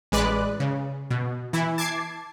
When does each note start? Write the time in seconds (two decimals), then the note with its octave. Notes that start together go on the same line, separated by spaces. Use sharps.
0.12 A1 G#3 B4 D5 F#6
0.60 C#3
1.11 B2
1.53 E3 E4
1.78 A5 D6 G#6 A6 C7